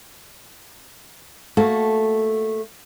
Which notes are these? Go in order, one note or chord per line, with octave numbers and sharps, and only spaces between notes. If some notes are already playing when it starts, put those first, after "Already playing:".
A3 A#3 F#4 A4